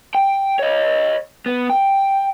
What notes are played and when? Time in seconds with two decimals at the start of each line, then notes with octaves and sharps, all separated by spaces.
0.15 G5
0.59 C#5 D#5
1.46 B3
1.70 G5